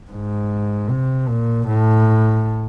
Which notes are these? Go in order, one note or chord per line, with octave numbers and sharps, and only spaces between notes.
G#2
C3
A#2
A2